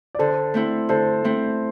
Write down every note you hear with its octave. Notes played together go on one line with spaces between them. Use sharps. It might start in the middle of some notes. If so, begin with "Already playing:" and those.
D5
D3 A4 C5
A3 C4 E4
D3 A4 C5
A3 C4 E4